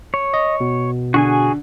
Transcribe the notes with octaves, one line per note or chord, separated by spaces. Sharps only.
C#5
D#5
B2
D3 F#4 G#4 G#5